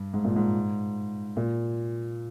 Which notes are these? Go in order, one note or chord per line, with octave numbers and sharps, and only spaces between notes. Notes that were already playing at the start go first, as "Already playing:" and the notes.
Already playing: G2
G#2
A#2
G#2
A#2